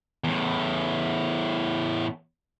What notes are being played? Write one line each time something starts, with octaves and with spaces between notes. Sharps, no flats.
E2 A2